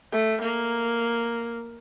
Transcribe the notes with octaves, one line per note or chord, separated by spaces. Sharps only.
A3
A#3